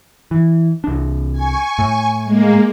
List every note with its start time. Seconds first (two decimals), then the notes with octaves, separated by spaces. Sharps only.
0.31 E3
0.84 C2 D4
1.32 G#5 C#6
1.79 A2
2.25 G#3 A#3